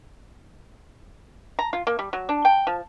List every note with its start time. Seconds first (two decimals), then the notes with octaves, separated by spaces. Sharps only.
1.59 A#5
1.73 F4
1.87 A#3
1.99 G3
2.13 F#3
2.29 D4
2.45 G5
2.67 F3